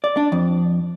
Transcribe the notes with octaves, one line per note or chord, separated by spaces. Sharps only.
D5
D4
F2